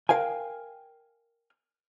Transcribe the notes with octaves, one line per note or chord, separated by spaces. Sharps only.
A#4 F5 G5 G#5